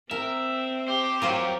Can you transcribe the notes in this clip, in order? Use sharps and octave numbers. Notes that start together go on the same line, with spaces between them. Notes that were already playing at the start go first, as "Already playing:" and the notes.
C4 A#4 E5
G4 C5
F#3 F4 A#4 C5 F#5